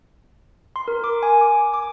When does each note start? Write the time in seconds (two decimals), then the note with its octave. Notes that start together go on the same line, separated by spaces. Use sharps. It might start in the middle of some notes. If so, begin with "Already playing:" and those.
0.76 C6
0.88 A#4
1.04 D6
1.23 G#5
1.41 D6
1.74 D6